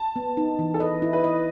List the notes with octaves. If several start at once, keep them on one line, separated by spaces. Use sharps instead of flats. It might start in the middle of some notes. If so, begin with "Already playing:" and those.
Already playing: A5
B3
D#4
E3
A4
B4 D#5
E4
B4
D#5